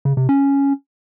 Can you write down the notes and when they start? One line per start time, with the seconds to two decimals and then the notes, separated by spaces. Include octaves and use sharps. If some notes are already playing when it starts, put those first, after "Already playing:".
0.05 C#3
0.17 C3
0.29 C#4